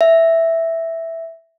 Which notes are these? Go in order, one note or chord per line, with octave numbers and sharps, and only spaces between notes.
E5